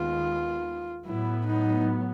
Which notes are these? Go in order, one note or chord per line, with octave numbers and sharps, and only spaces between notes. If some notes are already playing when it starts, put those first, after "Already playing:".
Already playing: D#2 D#3 G#3 B3 F4
A2 F#3 B3 E4
D#4